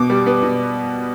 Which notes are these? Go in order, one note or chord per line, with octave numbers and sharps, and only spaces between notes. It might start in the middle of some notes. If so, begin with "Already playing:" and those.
Already playing: B2 D6
G3
B3
B2